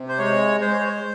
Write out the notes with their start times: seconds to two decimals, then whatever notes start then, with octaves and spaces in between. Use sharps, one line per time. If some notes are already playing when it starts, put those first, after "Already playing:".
Already playing: C3
0.08 C5
0.18 G#3 C#5
0.61 G#3 C5
0.72 C#5
0.84 C5